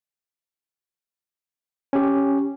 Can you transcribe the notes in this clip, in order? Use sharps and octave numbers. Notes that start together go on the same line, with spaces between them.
C#4 G4